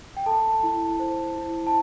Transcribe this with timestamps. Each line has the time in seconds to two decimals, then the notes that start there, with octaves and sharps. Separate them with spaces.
0.17 G5
0.26 A4 A5
0.63 E4
0.99 C5
1.36 E4
1.67 A5